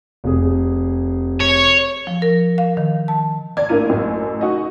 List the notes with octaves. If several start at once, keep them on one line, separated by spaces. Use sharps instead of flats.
F1 G#4
C#5
F3
A#4
F5
D#3
A5
D5 G#6
A1 A#3 D4 E4 A#4 D#7
A1 F#2 A2
D#4 F#4 D#5